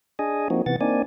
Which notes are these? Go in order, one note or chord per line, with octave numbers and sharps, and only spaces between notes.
D4 G#4 D#5 G#5
F3 A#3 C4 D#4 F#4
C3 E3 B3 F#5 A6
A#3 C4 D4 D#4 D5 G#5